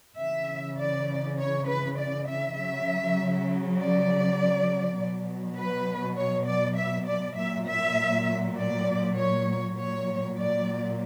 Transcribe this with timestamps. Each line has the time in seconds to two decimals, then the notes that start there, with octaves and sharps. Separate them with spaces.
0.19 C#3 E3 E5
0.78 D5
1.39 C#5
1.68 B4
1.99 D5
2.28 E5
2.58 C#3 F#3 E5
3.78 D5
4.97 B2 F#3
5.57 B4
6.17 C#5
6.47 D5
6.77 E5
7.08 D5
7.37 A#2 F#3 E5
7.68 E5
8.57 D5
9.17 C#5
9.77 A#2 F#3 C#5
10.38 D5